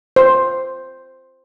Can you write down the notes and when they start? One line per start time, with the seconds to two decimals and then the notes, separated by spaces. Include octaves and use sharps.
0.16 C5